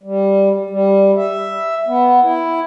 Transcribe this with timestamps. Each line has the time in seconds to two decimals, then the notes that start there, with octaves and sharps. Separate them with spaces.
0.03 G3
0.70 G3
1.16 E5
1.87 B3
2.23 E4